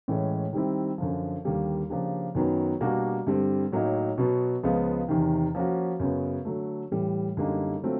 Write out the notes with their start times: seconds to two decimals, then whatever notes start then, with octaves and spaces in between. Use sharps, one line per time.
0.08 A2 E3 G#3 C#4
0.53 D#3 G3 C4 E4
0.98 F#2 D3 F3
1.45 D#2 D3 G3 A#3
1.90 C#3 F3 A#3 D4 G4
2.35 F#2 D#3 F#3 B3
2.81 B2 G3 A#3 D4 F#4
3.27 G2 D3 G3 C4
3.72 A2 F#3 A#3 D#4
4.18 B2 F#3 B3
4.63 C#2 C#3 F3 G#3 B3
5.08 E2 C3 D#3
5.55 F3 A#3 C#4 F#4
6.00 F#2 C#3 F#3 B3
6.45 D3 F#3 A3
6.91 A2 E3 G3
7.37 F#2 D3 G3 A#3 D#4
7.82 D3 F#3 A3 C4 F4